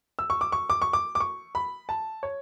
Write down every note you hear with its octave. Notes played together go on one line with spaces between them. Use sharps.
E6
C#6
D6
C#6
D6
C#6
D6
D6
C#6
B5
A5
C#5